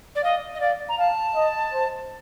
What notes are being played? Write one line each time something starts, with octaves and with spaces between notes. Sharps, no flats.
D5
D#5 F5
D#5
D5 F5
A#5
F5 A5
D#5
C5